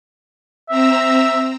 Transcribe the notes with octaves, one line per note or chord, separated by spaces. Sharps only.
C4 E5 A#5 E6